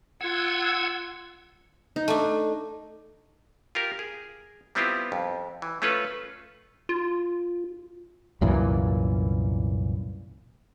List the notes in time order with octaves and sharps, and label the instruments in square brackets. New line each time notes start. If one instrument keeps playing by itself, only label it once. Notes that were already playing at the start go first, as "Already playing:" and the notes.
[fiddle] F4 [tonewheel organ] F#5 E6 G#6
[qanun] D#4
[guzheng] A3 D4
[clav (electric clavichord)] F4 G4 A#4
G#4
G3 B3 C4 E4 F4 G4
F2
E3
A3 C#4 F4 A4 B4
[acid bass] F4
[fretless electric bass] C2 F#2 A#2 E3